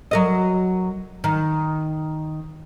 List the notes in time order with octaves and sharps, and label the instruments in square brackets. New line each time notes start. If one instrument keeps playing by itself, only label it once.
[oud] F#3 A#4 D#5
D#3